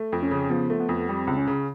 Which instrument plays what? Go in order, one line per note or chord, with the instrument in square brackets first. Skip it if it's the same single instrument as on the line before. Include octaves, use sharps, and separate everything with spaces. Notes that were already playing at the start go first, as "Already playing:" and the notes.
Already playing: [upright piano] A3
F2
[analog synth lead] C#4
[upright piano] C#3
[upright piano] F3 [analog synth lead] B3
[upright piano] A3
[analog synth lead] B3
[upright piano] F2
[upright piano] G3 [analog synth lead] C4
[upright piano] C#2
[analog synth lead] C#4
[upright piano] C#3